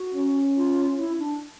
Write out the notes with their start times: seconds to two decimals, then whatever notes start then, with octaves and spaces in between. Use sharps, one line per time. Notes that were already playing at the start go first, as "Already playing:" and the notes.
Already playing: F#4
0.15 C#4
0.57 F4
0.98 E4
1.20 D4